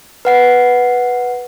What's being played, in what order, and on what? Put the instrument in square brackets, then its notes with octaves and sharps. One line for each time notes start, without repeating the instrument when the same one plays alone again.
[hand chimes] B4 F#5 C7